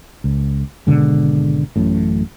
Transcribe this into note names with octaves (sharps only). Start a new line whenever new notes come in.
C#2
G#1 B2 D3 G#3
A1 F#2 A2